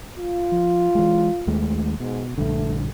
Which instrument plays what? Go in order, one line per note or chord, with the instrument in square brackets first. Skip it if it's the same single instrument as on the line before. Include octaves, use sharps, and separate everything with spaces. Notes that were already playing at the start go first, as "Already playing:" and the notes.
[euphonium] F4
[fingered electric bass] F3
E3 G#3
D#2 G#3 A3
[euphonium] G#2 [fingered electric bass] B2
[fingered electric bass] A#1 G2 D3 [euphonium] A3